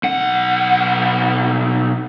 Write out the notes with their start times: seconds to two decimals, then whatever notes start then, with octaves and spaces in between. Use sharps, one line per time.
0.03 B1 F#5